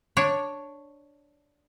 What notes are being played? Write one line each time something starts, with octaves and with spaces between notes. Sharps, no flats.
D4 C#5